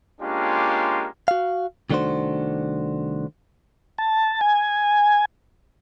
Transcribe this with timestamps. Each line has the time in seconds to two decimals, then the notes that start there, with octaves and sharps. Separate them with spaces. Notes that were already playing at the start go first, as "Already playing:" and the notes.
0.21 G#3 A#3 C#4 D4 F4 G4
1.28 F#4 F5
1.90 C2 D#3 A3 D4 F#4 C5
3.98 A5
4.41 G#5